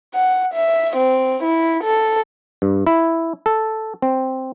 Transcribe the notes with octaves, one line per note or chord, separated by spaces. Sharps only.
F#5
E5
C4
E4
A4
G2
E4
A4
C4